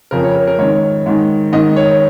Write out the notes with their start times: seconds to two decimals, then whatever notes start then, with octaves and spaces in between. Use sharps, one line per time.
0.11 F2 C#3 A#4
0.24 C#5
0.36 A#4
0.47 A#4
0.58 G#2 D#3 C#5
1.06 G#2 D#3
1.53 G#2 D#3 D#5
1.76 C#5